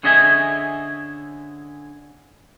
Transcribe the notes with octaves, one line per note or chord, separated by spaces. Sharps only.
D3 C#4 G#4 D#5 E5 G#5